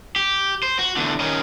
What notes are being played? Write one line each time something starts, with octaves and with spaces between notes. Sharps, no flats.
G4
C5
F#4
E2 D3
D#3 C#4